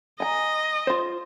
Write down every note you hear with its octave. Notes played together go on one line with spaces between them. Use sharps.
D#5 G#5 A#5
F4 C5